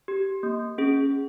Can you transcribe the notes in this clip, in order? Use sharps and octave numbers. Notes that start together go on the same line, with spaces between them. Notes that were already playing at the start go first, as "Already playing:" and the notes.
G4
A#3
C#4 G#4